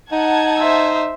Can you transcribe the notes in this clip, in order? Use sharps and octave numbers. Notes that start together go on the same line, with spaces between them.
D#4 F#5 A5 G#6
C5 E5